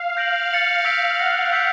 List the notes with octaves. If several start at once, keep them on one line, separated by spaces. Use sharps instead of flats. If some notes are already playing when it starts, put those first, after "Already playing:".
Already playing: F5
G6 A#6 D7 F#7
A6 C#7 F#7
E6 G6 B6 D7
F#5 F6 A#6 C#7
E6 G6 B6 D7 F7